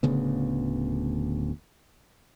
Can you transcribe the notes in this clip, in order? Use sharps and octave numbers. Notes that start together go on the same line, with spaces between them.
D1 D2 C#3 B3